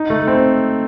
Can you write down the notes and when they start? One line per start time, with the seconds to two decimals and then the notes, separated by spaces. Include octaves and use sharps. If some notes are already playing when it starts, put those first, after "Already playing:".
Already playing: D#4
0.10 A3
0.27 C4